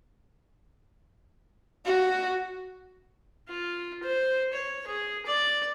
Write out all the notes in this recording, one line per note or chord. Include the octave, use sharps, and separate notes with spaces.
F#4
F4
C5
C#5
G#4
D5